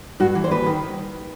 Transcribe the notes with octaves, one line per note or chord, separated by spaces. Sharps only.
G2 F#4
E3
C5
D#2 B4
D#3